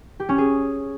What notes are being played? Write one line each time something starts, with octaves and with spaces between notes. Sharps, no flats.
G4
C#4
G#4